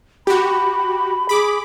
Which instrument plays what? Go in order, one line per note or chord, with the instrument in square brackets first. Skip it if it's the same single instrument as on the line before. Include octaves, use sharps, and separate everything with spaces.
[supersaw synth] F#4 G4 [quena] B5
[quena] G#4 [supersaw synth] B5 D6